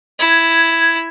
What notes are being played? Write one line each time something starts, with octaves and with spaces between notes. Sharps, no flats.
E4 G#6